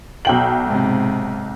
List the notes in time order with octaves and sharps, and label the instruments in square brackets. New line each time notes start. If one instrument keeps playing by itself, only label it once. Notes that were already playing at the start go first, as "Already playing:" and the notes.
[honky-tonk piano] B1 G5 F#7
[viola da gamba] G#2 C3